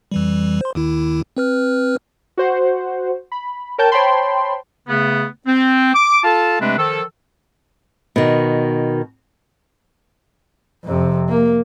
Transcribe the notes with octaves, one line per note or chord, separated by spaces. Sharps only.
F2 E3 G3
C5 C6
D#2 D#3 E4
C4 B4 F6
F#4 C5 F#5
B5
A#4 C#5 G5 A5 G6
C5 C#5 G5 A5 B5 C6
C#3 A3 B3
C4
D6
F4 A4 F5 A5
C3 G#3 A3 C4 D4 B4
D#3 F3 A4
B2 D#3
F2 C3
A#3